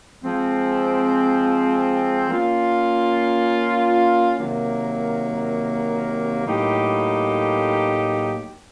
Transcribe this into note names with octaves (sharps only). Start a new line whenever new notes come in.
F3 G#3 C4
A#3 C#4 F4
C3 D#3 F#3 A#3
A2 F#3 A#3 D#4 G4